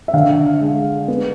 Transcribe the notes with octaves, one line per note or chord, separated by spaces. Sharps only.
E5
D3 F5
G#3
B3